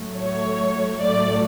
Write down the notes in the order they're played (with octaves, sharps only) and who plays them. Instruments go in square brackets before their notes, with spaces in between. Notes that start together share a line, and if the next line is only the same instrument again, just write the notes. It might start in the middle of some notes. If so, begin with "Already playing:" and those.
Already playing: [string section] A2 F#3 A3
C#5
A2 F#3 A3 D5